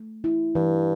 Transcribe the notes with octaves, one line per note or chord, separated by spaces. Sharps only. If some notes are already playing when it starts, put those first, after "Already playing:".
Already playing: A3
E4
G2 E3